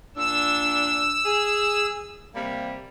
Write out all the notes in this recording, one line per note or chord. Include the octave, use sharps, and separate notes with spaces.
A#2 D4 E6
G#4
C3 G3 A#3